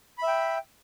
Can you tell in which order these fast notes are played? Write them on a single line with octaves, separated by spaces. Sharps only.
B5 E5 G5